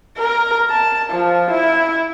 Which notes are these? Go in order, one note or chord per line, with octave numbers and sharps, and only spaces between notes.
A#4
A5
F3
E4